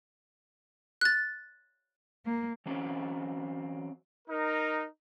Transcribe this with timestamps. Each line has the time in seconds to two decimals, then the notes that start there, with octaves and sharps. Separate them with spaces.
1.01 F#6 A6
2.26 A#3
2.66 E3 F#3 C4 C#4
4.28 D#4 A#4